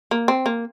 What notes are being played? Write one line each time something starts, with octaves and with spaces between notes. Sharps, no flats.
A#3
C4
A#3